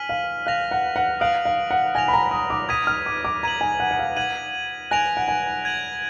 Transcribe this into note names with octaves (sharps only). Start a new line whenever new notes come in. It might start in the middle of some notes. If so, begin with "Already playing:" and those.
Already playing: G#5 F6 B6 D#7 F#7
F5
F5 F#6 A#6 F7
F#5
F#5
F5 D#6 F#6 D7 F#7
F5
F#5
G#5 F6 A#6 F7
B5
A#5
D#6
D6
D#6 G#6 B6 D#7
F6
D6
D6
A#5 G#6 D#7 F#7
G#5
F#5
F#5
F5
F#5 G#6 D#7 F#7
G#5 F#6 A#6 D7 F7
F#5
G#5
G#6 D#7 F#7